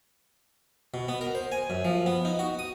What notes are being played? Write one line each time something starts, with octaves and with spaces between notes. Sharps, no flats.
B2
B3
A#4
C5
G#5
F#2
F3
B3
D#4
F#4
D#6